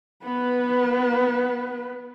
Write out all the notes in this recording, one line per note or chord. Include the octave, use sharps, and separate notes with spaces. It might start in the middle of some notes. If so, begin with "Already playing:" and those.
B3 B4